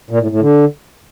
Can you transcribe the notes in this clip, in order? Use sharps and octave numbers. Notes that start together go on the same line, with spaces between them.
A#2
A2
A2
D3